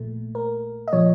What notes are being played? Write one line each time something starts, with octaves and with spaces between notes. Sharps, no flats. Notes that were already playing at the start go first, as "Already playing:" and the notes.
Already playing: A#1 A#2 A3
A#4
D#5
A#2 F3 C#5